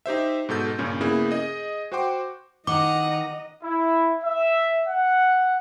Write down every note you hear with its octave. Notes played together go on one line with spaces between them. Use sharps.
D#4 G4 C5 E5
G#2 B2 A4 G6
G2 A#2 C#3 C#4
C#3 A#3 B3 E4 G#4
G#4 D#5 D#6
F#4 C5 F#5 G5 C6 D6
D#3 D#5 F#5 A#5 D6
E4
E5
F#5